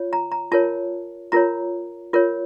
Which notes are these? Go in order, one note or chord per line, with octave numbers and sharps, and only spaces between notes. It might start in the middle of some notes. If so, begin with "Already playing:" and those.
Already playing: F4 C#5
A#5
A#5
F4 A#4 C#5 A5
F4 A#4 C#5 A#5
F4 A#4 C#5